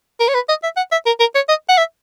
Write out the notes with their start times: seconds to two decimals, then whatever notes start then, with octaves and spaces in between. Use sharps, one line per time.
0.20 A#4
0.28 C#5
0.34 B4
0.49 D#5
0.63 E5
0.77 F#5
0.92 E5
1.06 A#4
1.20 A#4
1.35 C#5
1.49 D#5
1.69 F#5
1.78 E5